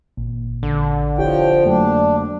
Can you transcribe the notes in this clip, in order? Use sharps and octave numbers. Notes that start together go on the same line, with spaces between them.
G#1 A#2
A1 D3
E1 F3 E4 G4 C#5 G5
F2 F#3 A3 A#3 D4